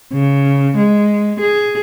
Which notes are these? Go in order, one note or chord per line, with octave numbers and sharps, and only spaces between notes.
C#3
G#3
G#4